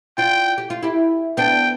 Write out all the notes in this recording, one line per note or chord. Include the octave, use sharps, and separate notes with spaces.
D4 F4 G5
G4
F4
E4 G4
B3 D4 G5